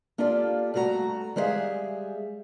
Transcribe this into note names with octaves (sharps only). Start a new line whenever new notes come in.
A#3 D4 F4 G4 A4 D5
G2 A3 F#4 A#4 A#5
G3 G#3 G#4 B4 E5 F5